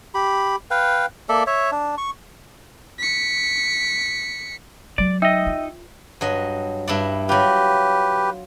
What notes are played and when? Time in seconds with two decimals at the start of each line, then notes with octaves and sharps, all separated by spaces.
0.14 G4 B5
0.71 B4 F5 G5
1.29 A#3 A4 D5 E5
1.47 C#5 E5
1.72 D4
1.98 C#6
2.99 B6 C#7
4.98 F#3 G#3 D5
5.22 D#4 D#5 E5 G5 E6
5.47 F4
6.21 G2 F#3 D#5
6.88 G2 E4 D5
7.29 F#3 F4 G4 B4